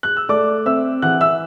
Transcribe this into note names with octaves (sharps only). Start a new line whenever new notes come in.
F#6
E6
A3 D5 D6
C4 E5 E6
E3 F#5 F#6
E5 E6